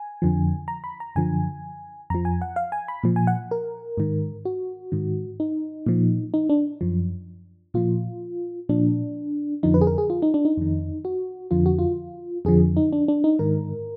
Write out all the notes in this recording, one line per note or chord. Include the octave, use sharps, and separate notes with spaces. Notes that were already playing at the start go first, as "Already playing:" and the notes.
Already playing: G#5
F2 D3 F3
A#5
B5
A#5
F#2 D3 F3 G#5
F2 F3 A#5
G#5
F#5
F5
G#5
B5
A#2 F3
G#5
F#5
A#4
G#2 D#3
F#4
G#2 D#3
D#4
A#2 F3
D#4
D4
F#2 F3
A#2 F3 F4
A#2 F3 D4
F2 D3 F3 D#4
B4
G#4
A#4
G#4
F4
D#4
D4
D#4
F2 D#3
F#4
F2 D3 F3 F4
F#4
F4
F2 D3 F3 G#4
D#4
D4
D4
D#4
G#2 D#3 A#4